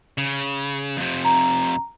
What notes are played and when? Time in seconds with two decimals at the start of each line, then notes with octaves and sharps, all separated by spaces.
0.18 C#3
0.97 F2 C3
1.25 A#5